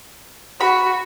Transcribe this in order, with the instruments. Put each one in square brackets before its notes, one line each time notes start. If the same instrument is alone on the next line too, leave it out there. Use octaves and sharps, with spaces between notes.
[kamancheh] F#4 [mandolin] B5